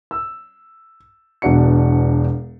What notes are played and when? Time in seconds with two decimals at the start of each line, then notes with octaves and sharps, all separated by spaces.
0.11 E6
1.42 E1 B2 D4 F#4 C#7